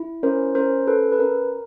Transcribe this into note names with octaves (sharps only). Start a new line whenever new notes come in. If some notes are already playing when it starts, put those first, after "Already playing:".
Already playing: E4
C#4 A#4 C5
C#4 A#4 C5
A4 B4
B4
C#4 A#4